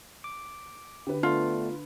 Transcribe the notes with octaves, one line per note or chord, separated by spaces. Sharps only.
D6
D3 G4 B4
A3 B3 D4 F4